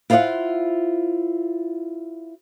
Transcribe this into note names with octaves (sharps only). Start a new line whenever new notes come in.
E4 F4 C5 D5 F5 F#5